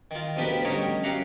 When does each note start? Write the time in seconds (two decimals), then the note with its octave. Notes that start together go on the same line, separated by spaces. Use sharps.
0.11 D#3 F4
0.36 D2 F3 B3 G4 A#4 B4
0.65 A1 D3 G3 D#4 A#4 C#5
1.04 F#2 G4 F5 F#5 A#5